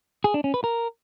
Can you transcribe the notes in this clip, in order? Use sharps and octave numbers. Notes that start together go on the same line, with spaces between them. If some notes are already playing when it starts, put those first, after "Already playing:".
G#4
D4
C#4
B4
A#4